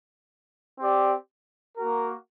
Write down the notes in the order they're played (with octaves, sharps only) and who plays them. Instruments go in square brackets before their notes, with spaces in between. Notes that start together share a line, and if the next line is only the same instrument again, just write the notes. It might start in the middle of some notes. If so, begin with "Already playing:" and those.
[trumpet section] C4 G4 D5
A#3 F#4 A#4